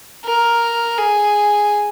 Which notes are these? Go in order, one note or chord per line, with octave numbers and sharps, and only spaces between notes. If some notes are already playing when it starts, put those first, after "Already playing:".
A#4
G#4